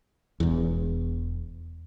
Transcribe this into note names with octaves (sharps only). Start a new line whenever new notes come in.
E1 E2